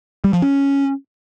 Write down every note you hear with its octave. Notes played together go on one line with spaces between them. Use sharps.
G3
F3
C#4